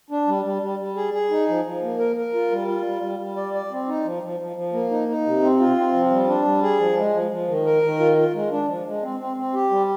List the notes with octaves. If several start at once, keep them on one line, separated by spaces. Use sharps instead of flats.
D4
G3
G3
G3
G3
G#4
G#4
D#4
F3
F3
A#3
A#4
A#4
F4
G3
F4
G3
G3
G3
D5
D5
C4
D#4
F3
F3
F3
F3
A#3
D#4
D#4
C3
C4
F4
C4
F3
G3
D4
G3
G#4
F3
G#3
F3
F3
D#3
A#4
D#3
F4
F4
G#3
D4
F3
G#3
C4
C4
C4
G4
G3